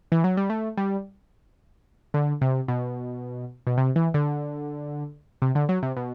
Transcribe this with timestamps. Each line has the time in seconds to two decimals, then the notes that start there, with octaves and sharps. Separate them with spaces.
0.12 E3
0.24 F#3
0.37 G3
0.50 A3
0.77 G3
2.14 D3
2.41 C3
2.68 B2
3.67 B2
3.78 C3
3.96 E3
4.14 D3
5.42 C3
5.55 D3
5.69 F#3
5.83 C3
5.97 B2